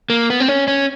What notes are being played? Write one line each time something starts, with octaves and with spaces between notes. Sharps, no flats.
A#3
B3
C4
C#4
C#4